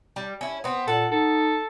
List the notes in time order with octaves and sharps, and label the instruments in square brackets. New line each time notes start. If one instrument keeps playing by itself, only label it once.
[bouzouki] G3
C#4 E4
B3 C4
[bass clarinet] A#2 [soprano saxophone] A4 [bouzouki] F#5
[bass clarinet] D#4 [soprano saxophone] A4